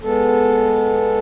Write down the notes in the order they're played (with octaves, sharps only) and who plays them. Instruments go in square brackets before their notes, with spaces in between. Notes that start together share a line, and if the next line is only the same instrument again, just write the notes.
[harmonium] G#3 B3 A4